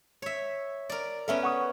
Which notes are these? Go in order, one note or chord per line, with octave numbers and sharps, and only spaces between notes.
C#5 E5
A#4 D5
B3 C#4 A4 A#4 E5
F#5 C#6 D#6